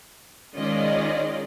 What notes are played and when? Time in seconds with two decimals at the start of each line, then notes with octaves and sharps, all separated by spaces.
0.56 D#3 G#3 C#4 F4 D5 D#5